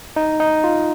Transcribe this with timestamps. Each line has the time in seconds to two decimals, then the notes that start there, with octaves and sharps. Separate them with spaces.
0.16 D#4
0.40 D#4
0.64 F4